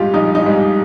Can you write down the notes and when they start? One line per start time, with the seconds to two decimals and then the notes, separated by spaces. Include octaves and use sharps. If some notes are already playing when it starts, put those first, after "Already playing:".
Already playing: A#1 G#2 G3 F4 G4
0.14 A#1 D#4
0.35 D#4
0.46 G#2 G3